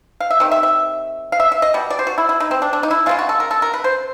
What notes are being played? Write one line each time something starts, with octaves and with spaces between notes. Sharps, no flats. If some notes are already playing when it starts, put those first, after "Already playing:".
F5
E5
C3 D#3
E5
E5
F5
E5
E5
D#5
B2 G3
D5
C5
F#4
E4
E4
D#4
C4
D4
D4
D#4
E4
C#3 F3 G#3 F4
F#4
A4
A#4
A4
A#4
B4
C5